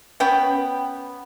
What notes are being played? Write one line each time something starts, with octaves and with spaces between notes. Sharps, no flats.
B3 C#4 G5